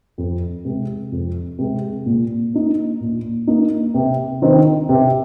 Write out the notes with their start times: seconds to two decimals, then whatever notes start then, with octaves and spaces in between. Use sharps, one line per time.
0.18 F2
0.65 C3 G#3
1.12 F2
1.59 C3 G#3
2.06 A#2
2.53 A#3 D#4
3.01 A#2
3.47 A#3 D#4
3.94 C3
4.42 D#3 C4 D#4
4.89 C3